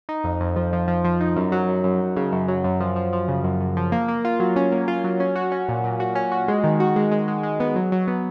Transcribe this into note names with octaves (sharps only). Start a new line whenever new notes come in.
D#4
F2
F2
F3
F3
F3
F3
D#4
F#2
F#3
F#2
F#2
F#2
C#3
F#2
F#3
F#2
F3
F3
F3
C#3
F#2
F#2
F3
A#3
A#3
F4
F#3
C#4
A#3
F4
F#3
C#4
F#4
C#4
A#2
A#2
F#4
C#4
F#4
G#3
D#3
F#4
G#3
G#3
G#3
G#3
B3
F#3
F#3
B3